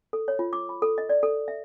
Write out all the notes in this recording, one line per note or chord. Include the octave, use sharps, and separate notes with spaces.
A4
C#5
F4
D6
B5
A4
D#5
D5
A4
E5